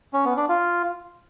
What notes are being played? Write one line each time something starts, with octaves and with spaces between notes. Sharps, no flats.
C#4
B3
D4
F4